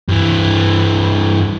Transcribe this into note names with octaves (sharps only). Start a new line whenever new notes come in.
G2 E3